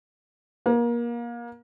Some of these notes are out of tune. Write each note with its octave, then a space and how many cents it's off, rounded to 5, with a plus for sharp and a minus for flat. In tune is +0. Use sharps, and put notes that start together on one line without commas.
A#3 +30